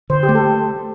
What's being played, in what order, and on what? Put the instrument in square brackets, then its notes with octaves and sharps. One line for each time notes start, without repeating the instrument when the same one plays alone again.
[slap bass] D3 [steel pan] C5
[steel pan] G4
[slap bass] A3
[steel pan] A4